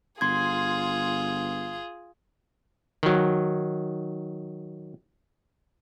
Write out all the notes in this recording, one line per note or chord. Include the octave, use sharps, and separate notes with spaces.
G1 F4 G#4 C6 G#6
D#3 F#3